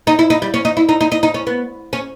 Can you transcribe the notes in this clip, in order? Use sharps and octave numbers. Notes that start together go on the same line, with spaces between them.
D#4
E4
D#4
G3
C#4
D#4
E4
D#4
D#4
D#4
D#4
C#4
B3
C#4